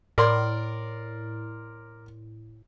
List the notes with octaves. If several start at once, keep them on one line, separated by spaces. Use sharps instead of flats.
A2 A#4 D5 C6